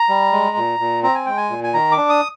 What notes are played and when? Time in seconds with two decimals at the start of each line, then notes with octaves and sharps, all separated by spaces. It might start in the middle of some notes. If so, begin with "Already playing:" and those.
Already playing: A#5
0.09 G3
0.32 G#3
0.57 A#2
0.79 A#2
1.03 C4 A#5
1.15 G#5
1.26 G#3 G5
1.37 G#5
1.50 A#2
1.64 G#5
1.74 D#3 A#5
1.92 D6
1.97 D4
2.09 D#6